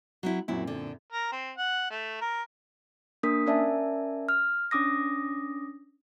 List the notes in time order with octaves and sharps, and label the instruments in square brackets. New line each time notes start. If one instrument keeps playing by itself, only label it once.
[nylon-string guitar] F#3 C4 E4
[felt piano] F#2 A#2 C4 [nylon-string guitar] F#3 E4
[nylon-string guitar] D3
[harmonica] A#4
C4
F#5
A3
A#4
[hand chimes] A#3 D4 A#4 D#6 B6
C#4 A#4 D5 E5 G#5 A5
F6
C#4 D4 D6 D#6 A#6